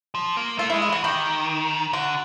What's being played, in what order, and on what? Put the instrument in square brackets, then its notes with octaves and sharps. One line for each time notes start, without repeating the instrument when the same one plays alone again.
[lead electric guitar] F3
A#3
[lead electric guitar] A3 [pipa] F4
[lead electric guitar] G#3 [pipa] E4
[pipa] F4
[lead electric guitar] E3 [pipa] F#4
[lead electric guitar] D#3 [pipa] G4
[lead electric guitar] D3 [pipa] F#4